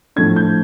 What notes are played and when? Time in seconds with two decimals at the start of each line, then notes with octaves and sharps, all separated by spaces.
0.16 A2 F3 A3 D4 G#6
0.36 G6